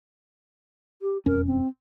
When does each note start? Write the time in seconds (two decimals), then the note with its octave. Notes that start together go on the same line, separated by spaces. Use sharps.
1.02 G4
1.26 E1 F2 C#4 A#4
1.47 C4